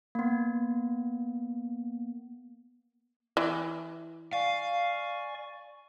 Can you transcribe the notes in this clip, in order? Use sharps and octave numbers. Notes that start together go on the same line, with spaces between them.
A#3 B3
E3
D5 F5 G#5 C#6